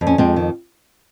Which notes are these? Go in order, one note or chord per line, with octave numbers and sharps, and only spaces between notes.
F2
C#4
F2 G#3 C4
D#3